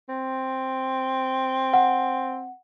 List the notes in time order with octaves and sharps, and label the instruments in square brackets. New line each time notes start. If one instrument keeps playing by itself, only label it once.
[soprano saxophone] C4
[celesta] F#5